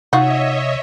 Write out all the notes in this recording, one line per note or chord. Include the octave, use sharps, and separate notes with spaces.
C3 D#4 F4 F#4 C#5 D#5 E5